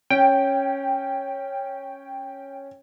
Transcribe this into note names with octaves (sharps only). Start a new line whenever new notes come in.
C#4 G5